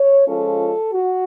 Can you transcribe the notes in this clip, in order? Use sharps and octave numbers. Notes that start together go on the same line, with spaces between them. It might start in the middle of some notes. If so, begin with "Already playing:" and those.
Already playing: C#5
F3 G#3 C#4 F4 A4
F#4